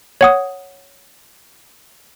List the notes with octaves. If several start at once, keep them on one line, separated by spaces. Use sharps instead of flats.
C#5 F#5 D#6